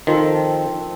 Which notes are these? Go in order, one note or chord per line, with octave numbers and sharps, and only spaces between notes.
D#3 F3 C4 A4